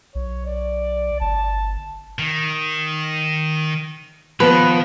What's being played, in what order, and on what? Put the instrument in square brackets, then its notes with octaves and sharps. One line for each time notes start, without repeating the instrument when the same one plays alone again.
[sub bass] B1 [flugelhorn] C#5
[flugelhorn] D5
[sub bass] G1 [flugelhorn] A5
[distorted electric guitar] D#3
[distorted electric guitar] D#3 [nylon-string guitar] F3 B3 [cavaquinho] B4